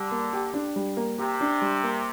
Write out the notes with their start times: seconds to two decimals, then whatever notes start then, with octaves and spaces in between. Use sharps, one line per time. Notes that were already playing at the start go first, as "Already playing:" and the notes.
Already playing: D3 G3
0.11 A#3
0.33 G4
0.54 D4
0.76 G3
0.97 A#3
1.18 C3 G4
1.41 D4
1.61 G3
1.84 A#3